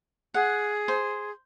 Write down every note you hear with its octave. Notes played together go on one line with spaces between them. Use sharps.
G#4 F#5
C5